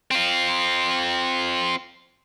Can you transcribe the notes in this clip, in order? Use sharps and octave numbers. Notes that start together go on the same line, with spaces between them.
C4 F4